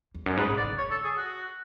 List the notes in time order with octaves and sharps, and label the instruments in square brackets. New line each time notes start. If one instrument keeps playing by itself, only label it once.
[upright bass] E2
F#2
[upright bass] G#2 [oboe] B4
[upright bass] B2
[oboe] D5
[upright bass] C#3
[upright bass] D3 [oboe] C#5
[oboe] A4
G#4
F#4